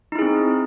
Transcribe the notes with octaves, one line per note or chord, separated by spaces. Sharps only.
C4 D#4 E4 G#4